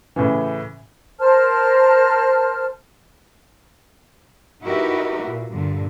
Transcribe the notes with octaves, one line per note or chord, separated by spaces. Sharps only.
A2 C#3 E3
A#4 C5 A5 F6
D#4 E4 F#4 G4 A#4 B4
A#2
G2 A#2 D3